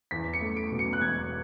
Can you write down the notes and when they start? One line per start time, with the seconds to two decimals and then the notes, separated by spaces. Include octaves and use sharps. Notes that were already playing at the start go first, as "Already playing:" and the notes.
0.11 E2 B6
0.34 C#7
0.41 A3
0.57 D7
0.72 B2
0.79 C#7
0.93 F#6
1.01 E1 G#6